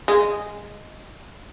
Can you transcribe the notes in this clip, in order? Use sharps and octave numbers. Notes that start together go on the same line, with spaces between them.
G#3